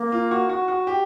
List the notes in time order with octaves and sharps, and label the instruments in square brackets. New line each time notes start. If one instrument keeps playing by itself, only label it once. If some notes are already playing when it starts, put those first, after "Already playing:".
Already playing: [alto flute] A#3
[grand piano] F4
F#4
F#4
F#4
G4